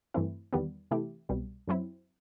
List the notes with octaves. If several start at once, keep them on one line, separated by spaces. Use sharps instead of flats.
G2 E3 A3 C4 E4
E2 D#3 G3 B3
C3 E3 A3 E4 G4
C2 B2 G3
F#2 F#3 C4 E4